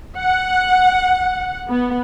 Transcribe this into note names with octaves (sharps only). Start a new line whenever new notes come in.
F#5
B3